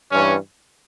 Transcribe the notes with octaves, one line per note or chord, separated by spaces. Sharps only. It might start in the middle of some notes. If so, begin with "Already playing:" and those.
G2 E3 C#4